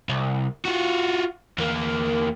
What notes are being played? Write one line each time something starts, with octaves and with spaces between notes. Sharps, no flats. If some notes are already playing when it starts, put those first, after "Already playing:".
C2
F4 F#4
E2 A#3